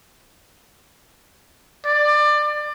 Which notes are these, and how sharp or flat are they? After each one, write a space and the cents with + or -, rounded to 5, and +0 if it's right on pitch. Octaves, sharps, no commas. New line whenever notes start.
D5 +20